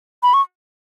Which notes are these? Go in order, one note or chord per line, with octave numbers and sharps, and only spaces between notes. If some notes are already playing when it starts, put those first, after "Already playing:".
B5
C#6